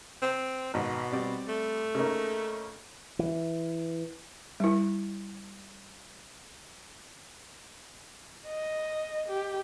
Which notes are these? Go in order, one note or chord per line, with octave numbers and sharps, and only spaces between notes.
C4
G#1 B2
G3 C4 D5
A3
C#3 A#3 D#4
E3
G3 E4
D#5
G4